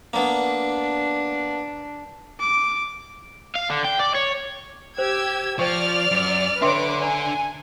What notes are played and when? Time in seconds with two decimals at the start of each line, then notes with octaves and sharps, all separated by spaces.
0.13 A#3 B3 D4
2.40 D6
3.56 F5
3.70 D3
3.85 G5
4.00 D5
4.15 C#5
4.98 G4 C5 E6 G#6
5.59 F3 C5 D5 G5 C#6 F6
6.11 F#2
6.62 D3 D4 B4 C#5 E5 G5 C6 D6
7.02 D5 G#5 A#5